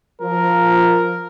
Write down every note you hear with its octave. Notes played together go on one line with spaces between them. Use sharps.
F3 A#4